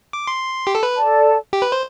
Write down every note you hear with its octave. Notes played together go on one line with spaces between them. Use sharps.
D6
C6
G4
A4
B4
A4 D5 A5
G4
B4
C5